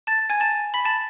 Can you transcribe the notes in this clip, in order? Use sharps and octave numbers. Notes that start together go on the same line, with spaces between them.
A5 A6
G#5 G#6
A5 A6
B5 B6
A5 A6